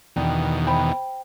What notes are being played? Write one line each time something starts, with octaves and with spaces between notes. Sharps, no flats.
E2 B2 D#3 D4 D5 G5
C5 G5 B5